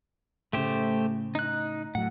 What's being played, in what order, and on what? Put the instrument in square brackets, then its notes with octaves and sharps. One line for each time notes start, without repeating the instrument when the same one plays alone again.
[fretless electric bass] A2 C#3 [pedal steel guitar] A3 G4 C5
[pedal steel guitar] D#4 F#6
[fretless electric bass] A2 F#3 [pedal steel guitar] F#5